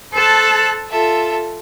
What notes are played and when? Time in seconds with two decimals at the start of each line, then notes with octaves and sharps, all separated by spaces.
0.14 A4 C5 A5 E6 F#6
0.90 F4 A4 E5